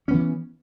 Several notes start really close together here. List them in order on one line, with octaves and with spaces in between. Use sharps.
C#4 B3 E3